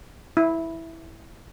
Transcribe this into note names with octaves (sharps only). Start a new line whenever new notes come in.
E4